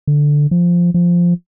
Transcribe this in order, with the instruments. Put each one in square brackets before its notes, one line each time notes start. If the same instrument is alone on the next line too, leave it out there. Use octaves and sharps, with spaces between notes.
[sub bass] D3
F3
F3